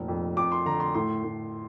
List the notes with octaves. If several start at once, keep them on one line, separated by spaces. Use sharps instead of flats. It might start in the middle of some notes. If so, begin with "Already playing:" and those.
Already playing: F1 A#2
F2
F2 D6
C6
D3 A#5
C6
A2 C6
A2